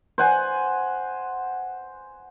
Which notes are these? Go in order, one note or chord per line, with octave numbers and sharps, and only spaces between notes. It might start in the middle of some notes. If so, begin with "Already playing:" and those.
C5 F#5 G#5